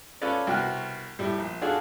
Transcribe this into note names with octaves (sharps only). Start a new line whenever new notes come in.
C#4 F4 A4 B4 C#5 D5
C2 B2 F#4 F6
A2 G3
A#1
D4 F4 F#4 G#4 A4 D5